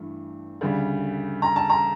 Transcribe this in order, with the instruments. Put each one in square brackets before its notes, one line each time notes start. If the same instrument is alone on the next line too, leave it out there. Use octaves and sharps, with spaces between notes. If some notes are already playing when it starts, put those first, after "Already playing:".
Already playing: [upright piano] G2 E3 A3
D2 C#3 G3
A#5
A5
A#5